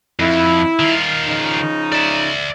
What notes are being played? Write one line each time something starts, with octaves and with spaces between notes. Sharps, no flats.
F2 E4
D#3 F4
C#3 F3 D#4
D5 E5